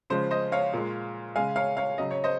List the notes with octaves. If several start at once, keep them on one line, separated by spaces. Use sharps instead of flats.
C#3 F3 G#3 C5
C5 D#5
C#5 F5
A#2 G#3
C#3 G#3 F5 G#5
C#5 F5
C#5 F5
C#3 F#3 D#5
C#5
C5 D#5